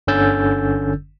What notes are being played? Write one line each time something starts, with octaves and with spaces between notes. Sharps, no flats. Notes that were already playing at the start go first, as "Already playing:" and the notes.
G1 D3 C#4 E6 G6 A6